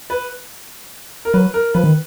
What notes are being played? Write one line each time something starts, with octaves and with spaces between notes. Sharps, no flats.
B4
A#4
F#3 B4
A#4
F3 B4
D#3